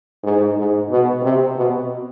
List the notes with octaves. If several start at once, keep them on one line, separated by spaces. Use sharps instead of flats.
G#2
G#2
B2
C3
B2